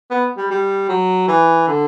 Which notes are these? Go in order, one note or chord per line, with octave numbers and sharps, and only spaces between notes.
B3
G3
G3
F#3
E3
D3